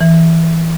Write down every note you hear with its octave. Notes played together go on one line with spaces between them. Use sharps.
E3